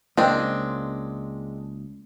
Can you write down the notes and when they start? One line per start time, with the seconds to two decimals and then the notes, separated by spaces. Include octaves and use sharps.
0.17 C#2 G#3 A#3 C4 D4